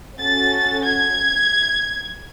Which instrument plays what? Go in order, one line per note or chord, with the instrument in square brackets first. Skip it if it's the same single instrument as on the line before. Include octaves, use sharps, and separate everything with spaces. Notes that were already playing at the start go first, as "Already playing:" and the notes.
[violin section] C#4 F#4 A4 A6
G#6